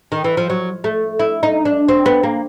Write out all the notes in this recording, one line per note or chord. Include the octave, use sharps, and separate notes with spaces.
D#3
E3
F3
F#3
A3
E4
D#4
D4
C4
B3
A#3